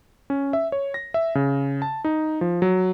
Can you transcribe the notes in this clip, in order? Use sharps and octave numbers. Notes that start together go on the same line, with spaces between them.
C#4
E5
C#5
A#6
E5
C#3
A5
D#4
F3
F#3